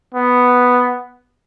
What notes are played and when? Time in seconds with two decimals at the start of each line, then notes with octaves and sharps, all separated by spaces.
0.14 B3